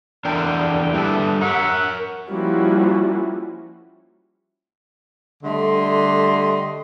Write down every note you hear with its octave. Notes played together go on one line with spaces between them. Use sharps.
E2 D3 D4 A#4 G5
E3 G3 D4 A4
A#4 C#5 E5 F#5
F3 G3 A#3 C#4 E4 F#4
D3 G3 A3 D#5 C6